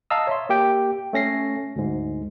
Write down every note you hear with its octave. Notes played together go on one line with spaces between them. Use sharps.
D#5 F5 A5 A#5 D#6 E6
C#5 E5 C6
A#3 G4 G5
A3 C#4 A#6 C7
D2 G#2